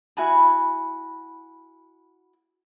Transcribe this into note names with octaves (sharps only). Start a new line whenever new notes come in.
E4 F#4 G#5 B5